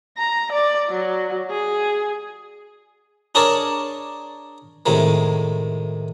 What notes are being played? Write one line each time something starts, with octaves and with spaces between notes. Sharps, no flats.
A#5
D5
F#3
G#4
D4 G#4 A#4 C#5 D5 A5
A2 C3 D#3 G#3